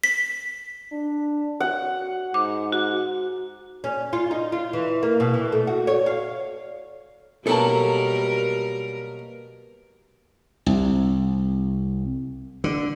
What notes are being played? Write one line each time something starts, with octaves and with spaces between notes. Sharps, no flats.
B6
D4
F#4 F#5
G#2 D6
F#4
C#4
F4
D#4
F4
E3
A#3
B2
E3
A3
F#4
C#5
F5
B2 F#3 G3 A#3 A4 A#4 G5 A5
C2
D3